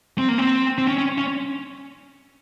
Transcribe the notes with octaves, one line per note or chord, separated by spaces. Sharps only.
C4
A#3
C4
C4
C#4
C#4
C#4